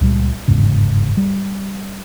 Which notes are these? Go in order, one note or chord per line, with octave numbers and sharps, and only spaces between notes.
C#2 A#2 G3
G1 E2 G#2 C#3
G3